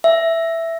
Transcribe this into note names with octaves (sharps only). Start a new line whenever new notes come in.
E5